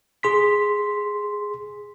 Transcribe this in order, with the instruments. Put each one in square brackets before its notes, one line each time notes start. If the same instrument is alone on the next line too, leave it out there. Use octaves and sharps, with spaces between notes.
[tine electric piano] G#4 C6 B6